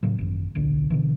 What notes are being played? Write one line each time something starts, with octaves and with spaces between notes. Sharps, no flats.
A2 C#3 F#3
G#1 F#2
D1 B1 D3
B2 D3 E3